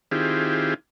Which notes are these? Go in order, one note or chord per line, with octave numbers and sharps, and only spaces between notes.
D#3 C4 E4 F4 G4 G#4